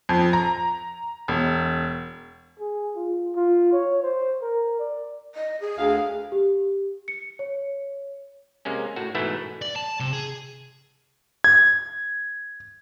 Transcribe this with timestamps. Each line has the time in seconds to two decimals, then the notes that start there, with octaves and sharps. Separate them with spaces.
0.09 F2
0.33 A#5
1.28 E1
2.60 G#4
2.96 F4
3.36 F4
3.72 C#5
4.03 C5
4.42 A#4
4.79 D5
5.35 D#5
5.61 G#4
5.78 D2 F5
6.32 G4
7.08 C#7
7.39 C#5
8.65 C3 G#3 A#3 C#4
8.96 A2 F#4
9.15 G#2 B2 E3 A3 B3 E4
9.62 D5
9.76 A5
10.00 C3
10.13 G#4
11.44 G#6